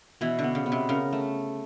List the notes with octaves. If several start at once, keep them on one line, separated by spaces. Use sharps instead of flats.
B2 E3
D3
B3
C#3
B3
C3
C#3 A#4
A3